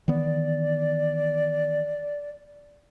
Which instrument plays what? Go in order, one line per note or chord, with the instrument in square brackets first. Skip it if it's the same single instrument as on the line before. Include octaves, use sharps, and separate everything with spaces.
[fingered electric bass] D#3 E3 B3 [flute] D5